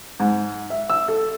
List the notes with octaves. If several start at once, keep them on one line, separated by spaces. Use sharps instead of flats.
G#2
E5
E6
A4